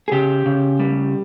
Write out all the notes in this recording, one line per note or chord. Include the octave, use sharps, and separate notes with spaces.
G#4
C#3 G4
C#3
G3